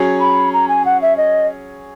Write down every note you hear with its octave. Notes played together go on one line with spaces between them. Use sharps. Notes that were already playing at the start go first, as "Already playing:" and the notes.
Already playing: F#3 C#4 G#4
B5
A#5
G#5
F#5
E5
D#5